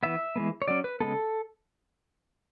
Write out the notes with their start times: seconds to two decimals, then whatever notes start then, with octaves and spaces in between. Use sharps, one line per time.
0.03 E3 B3 E5
0.36 E3 G#3 B3
0.62 C#5
0.68 F#3 C#4 D5
0.84 B4
1.00 C#3 G#3 B3 A4